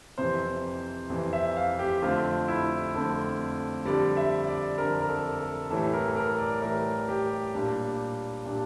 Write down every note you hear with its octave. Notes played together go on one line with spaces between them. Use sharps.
F2 C3 E3 C5
F2 C3 E3
E5
F5
G4
F2 D3 A3 C4 F4
E4
F2 D3 A3 C4
F2 D3 G3 D5
E5
D5
F2 D3 G3 A#4
A#4
A4
A4
A2 E3 G3 A4
A#4
A4
A#4
D5
A2 E3 G3 A#4
G4
A#2 G3 D4
A#2 G3 D4